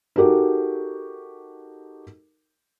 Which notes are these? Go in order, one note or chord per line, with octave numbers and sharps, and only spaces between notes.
D#4 F#4 G4 A4 A#4